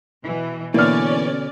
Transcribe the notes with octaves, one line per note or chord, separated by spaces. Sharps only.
B2 E3
B2 D3 E3 A#3 C#4 D5 F6